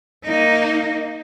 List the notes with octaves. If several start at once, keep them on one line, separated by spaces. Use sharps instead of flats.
A#3 D#4